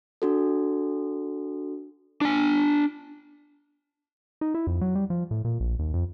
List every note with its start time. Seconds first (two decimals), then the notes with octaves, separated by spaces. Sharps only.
0.22 D4 F#4 A4
2.21 D4 G#5
4.41 D#4
4.54 E4
4.67 F2
4.81 F#3
4.95 G3
5.10 F3
5.31 A2
5.45 A#2
5.60 A#1
5.79 D#2
5.94 F2